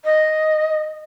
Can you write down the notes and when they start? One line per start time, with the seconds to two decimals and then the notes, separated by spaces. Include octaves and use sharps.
0.04 D#5